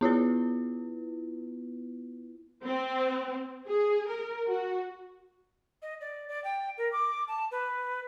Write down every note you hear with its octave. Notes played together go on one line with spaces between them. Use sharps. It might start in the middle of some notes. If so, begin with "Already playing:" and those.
B3 E4 F4 B4
C4
G#4
A#4
F#4
D#5
D5
D5
G5
A#4
D6
A5
B4